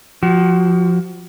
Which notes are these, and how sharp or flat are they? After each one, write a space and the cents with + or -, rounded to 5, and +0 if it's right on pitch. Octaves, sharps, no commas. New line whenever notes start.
F3 +15 F#4 +35